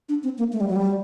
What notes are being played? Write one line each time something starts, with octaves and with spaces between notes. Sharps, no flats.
D4
C4
A#3
A3
G3
F#3
G3